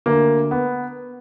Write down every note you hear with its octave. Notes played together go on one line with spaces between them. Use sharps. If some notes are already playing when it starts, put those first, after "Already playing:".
D2 A#3
B3